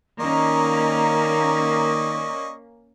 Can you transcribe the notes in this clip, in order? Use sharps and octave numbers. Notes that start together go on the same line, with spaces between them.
D#3 A#3 C#4 D5 D#5 A#5 C#6